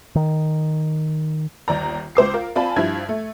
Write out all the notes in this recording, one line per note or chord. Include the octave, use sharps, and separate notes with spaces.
D#3
G1 D#2 D5 A#5
C#2 C5 D6 C7
F4 A#4
C4 F4 D5 G#5 A5 B5
G2 F3 E4 G#6
A3